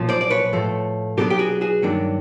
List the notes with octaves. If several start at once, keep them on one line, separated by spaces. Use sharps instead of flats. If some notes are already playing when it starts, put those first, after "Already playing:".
Already playing: B1 A#2 F3
C5 D5
D5
B4 C#5
A2 F3 A3
B2 F#3 B3 D4 G4 A4
G4
F#4 G#4
F#4 G#4
G2 D#3 F#3 A#3 D4